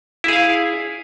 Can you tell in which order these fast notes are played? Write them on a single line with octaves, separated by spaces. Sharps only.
E4 G#4 F5